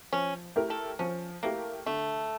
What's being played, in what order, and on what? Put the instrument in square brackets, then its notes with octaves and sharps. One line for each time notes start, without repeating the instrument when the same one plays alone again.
[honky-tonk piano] F3 [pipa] C#4
[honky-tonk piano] A3 E4 G4 A#4
[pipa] A4
[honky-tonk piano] F3 [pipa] C#4
[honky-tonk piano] A3 E4 G4 A#4 [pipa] A#3
[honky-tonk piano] D3 [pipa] A3